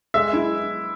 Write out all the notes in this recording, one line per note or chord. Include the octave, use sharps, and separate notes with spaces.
G#3 E5
E4